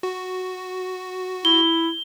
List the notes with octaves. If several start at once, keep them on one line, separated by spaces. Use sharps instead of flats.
F#4
E4 G7